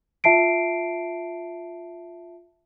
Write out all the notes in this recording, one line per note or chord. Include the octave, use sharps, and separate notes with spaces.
F4 E5 A5 C7 D7